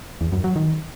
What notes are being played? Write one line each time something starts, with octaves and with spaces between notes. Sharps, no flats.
E2
F#2
F#3
D#3